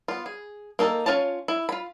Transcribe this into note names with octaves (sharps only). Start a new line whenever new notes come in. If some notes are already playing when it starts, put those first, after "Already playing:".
B3 F4
G#4
A#3 D#4 A4 A#4
C#4 F4 C#5 A5
E4
F4 B5